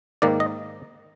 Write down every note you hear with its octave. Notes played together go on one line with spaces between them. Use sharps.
G#2 D#3 A#3 D5
D#5